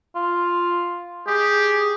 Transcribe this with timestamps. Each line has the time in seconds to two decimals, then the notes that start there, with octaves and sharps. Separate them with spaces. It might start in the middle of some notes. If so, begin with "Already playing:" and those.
0.15 F4
1.27 G4 G#4